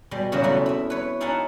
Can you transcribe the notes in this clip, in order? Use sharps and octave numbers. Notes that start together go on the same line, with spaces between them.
B2 G3 G#3
A#2 C#3 E3 F#3 G3 F#4
E2 E3 A3 B3 C4
E4 E5
B4 C#5
D#4 G#4 A#4 E5 F#5 A5